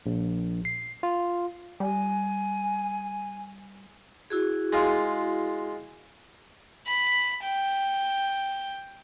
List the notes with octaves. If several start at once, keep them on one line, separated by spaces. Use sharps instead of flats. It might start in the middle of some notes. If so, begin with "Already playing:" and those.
A#1
C7
F4
G3 G#5
E4 F#4 G#4
G#3 F4
B5
G5